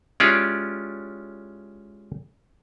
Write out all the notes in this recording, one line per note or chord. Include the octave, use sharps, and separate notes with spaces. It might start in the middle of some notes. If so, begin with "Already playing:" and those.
G#3 C#4 E4 F4 G4 D5